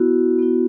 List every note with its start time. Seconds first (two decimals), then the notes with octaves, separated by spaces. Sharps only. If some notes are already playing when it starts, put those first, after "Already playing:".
Already playing: B3 E4 F#4
0.39 B3 E4